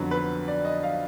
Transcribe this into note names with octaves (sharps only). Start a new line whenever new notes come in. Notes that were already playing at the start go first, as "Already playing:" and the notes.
Already playing: F2 D3 F#3 B3 B4
B4
D5
D#5
F5